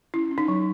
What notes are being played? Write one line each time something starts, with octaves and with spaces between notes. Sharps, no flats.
C#4 E4
C#4
D#4
F#3